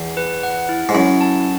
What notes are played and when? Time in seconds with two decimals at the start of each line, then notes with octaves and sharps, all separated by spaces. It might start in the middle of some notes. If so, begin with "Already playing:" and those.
Already playing: E2
0.17 B4
0.43 F#5
0.69 E4
0.89 G#2
0.94 F#2 E4
1.21 A5